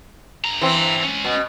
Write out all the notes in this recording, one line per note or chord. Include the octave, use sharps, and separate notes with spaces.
G2 A#5
E3 C4
G#3 C#4
B2